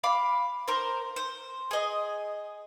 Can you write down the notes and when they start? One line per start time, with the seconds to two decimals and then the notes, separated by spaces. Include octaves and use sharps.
0.04 F5 B5 D6
0.68 A#4 C5
1.16 C5
1.71 G#4 D#5